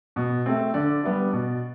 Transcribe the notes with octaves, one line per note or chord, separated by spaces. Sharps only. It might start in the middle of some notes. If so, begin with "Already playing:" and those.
B2
A3 C4
D3 D5
G3 B3 D4
B2